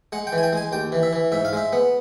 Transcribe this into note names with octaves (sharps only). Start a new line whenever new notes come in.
G#3 F#5
G5
E3
G#5
G5
G#3 G#5
D#2 G5
E3
E5
E3
G#2 E5
F5
G#3 E5
B3